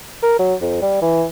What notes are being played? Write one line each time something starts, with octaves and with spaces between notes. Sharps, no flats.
A#4
F#3
F2
G3
E3